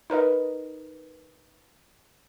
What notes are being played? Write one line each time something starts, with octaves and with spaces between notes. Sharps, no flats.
D#4 A#4 B4 D#5